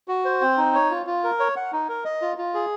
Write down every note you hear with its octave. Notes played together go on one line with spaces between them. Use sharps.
F#4
C5
C4
D#4
C#5
F4
F4
A#4
C#5
F#5
D#4
A#4
D#5
F4
F4
G#4